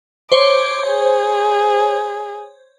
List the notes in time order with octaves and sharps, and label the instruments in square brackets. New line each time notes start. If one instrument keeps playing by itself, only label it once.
[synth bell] C5 C#5 [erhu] D6
[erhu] G#4